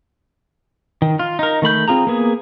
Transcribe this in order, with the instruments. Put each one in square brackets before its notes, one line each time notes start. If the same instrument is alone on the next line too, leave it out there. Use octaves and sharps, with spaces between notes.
[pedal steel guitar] D#3
F4
D#4 A#4
D#3 A3 B5 G6
C4 F4 G#4 A#5
A#3 B3 G#4